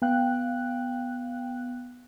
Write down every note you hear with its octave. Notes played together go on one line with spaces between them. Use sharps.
B3 F5 G5 F#6